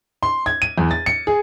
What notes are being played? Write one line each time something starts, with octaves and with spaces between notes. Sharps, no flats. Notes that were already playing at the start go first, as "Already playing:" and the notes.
C6
G#6
D#7
E2
A6
C#7
G#4